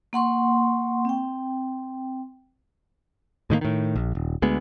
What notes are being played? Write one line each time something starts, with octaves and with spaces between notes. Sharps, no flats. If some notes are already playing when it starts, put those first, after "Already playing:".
A#3 F#5 C6 C#6
C4 G5
A2 D#3 F#3 A#3
A2 D#3
A#1
D#1
D2 G#3 B3